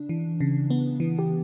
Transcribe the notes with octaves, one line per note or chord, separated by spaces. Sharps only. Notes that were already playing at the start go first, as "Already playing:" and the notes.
Already playing: C#3 D4
E3
C#3
B3
E3
G4